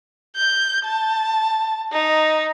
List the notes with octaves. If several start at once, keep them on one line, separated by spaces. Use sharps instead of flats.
G6
A5
D#4